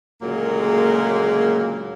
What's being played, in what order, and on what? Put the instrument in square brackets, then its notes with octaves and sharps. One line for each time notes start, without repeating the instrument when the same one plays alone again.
[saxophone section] D2 A#2 C#3 F#3 G#3 A#3